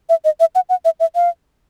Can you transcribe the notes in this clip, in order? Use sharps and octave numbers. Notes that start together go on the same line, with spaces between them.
E5
D#5
E5
F#5
F#5
E5
E5
F5